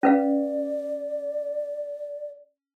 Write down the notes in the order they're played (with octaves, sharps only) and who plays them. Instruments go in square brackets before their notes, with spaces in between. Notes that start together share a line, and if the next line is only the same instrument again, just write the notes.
[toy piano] C#4 B4 F5 [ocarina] D5